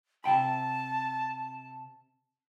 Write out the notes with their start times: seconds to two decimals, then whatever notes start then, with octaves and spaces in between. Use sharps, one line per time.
0.24 C3 G5 A5 B5